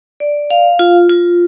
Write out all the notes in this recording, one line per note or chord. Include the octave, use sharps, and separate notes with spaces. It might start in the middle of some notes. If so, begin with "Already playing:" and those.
D5
F5
F4
F4